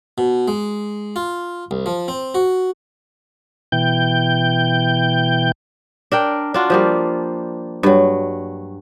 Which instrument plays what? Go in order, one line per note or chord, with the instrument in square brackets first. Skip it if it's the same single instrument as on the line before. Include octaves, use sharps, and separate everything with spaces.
[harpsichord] B2
G#3
F4
C2
F3
C4
F#4
[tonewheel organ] B2 E3 G5 G6
[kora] D4 A#4 G5
D4 F4 F#4
F3 G3 A#3
G2 F#3